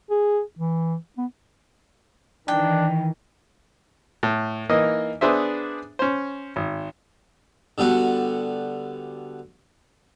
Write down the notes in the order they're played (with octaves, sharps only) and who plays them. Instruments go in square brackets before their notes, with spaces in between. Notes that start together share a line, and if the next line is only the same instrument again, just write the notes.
[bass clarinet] G#4
E3
B3
[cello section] D#3 E3 [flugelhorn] D4 [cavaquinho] G5
[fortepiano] A2
E3 A#3 D#4 D#5
B3 D4 G#4 C5 E5
C#4 C5
G#1
[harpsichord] D3 G3 B3 F#4